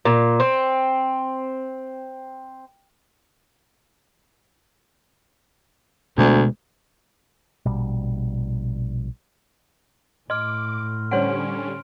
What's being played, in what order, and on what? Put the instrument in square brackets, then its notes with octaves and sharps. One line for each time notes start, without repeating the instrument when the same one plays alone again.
[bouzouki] A#2
C4
[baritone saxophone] D2 [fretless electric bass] B2 G#3 B3
[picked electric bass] A#1 B2 G3
[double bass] A2 [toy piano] D#5 [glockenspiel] C6 F6 [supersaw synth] D6
[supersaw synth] D3 G3 C#4 [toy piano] C5 C#5 F#5 [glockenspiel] C6 D7